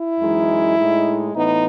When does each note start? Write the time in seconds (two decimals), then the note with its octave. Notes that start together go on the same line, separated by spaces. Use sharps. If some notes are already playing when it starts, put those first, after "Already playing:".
Already playing: E4
0.20 F#2 E3 G#3 D#4
0.77 A2 G#3 D#4
1.34 A2 E3 B3 D#4